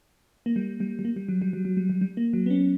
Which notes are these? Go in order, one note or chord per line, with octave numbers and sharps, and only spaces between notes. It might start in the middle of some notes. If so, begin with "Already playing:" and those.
A#3
G3
G3
G3
A#3
G3
F#3
G3
F#3
F#3
G3
G3
G3
A#3
F#3
B3
C#4